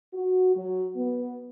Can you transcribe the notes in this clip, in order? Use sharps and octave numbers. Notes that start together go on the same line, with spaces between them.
F#4
F#3
B3